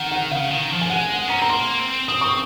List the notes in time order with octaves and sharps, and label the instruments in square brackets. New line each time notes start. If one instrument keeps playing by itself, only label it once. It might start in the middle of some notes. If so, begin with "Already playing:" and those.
Already playing: [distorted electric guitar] D#3 [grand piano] F#5
[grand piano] F#5
[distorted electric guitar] C#3 [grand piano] F5
[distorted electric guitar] D#3
F3
[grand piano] G#5
[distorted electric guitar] G#3 [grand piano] F#5
[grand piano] F#5
[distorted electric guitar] C#4 [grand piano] A#5
[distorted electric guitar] C4 [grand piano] A#5
[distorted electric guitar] A#3 [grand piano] C6
[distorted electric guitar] C4
[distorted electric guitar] C4 [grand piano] D#6
[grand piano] C#6